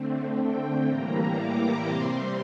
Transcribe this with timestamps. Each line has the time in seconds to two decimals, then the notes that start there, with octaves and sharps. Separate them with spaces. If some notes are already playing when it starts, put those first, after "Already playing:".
Already playing: D3 A3 C4
0.38 G5
0.87 A2 E3 G3 A#3 A#5
1.36 D6
1.85 C3 G3 C4 C6